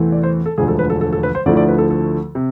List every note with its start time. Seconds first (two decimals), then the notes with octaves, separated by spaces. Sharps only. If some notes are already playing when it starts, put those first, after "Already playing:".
Already playing: E2 C3 E3 A3 C4
0.12 D5
0.23 C5
0.46 A4
0.58 E1 D2 D3 F3 G#3 G#4
0.68 A4
0.79 B4
0.90 A4
1.01 A4
1.13 A4
1.23 B4
1.35 C5
1.46 D2 D3 F3 A3 E4 D5
1.57 D5
1.68 B4
1.78 A4
1.90 A4
2.35 C3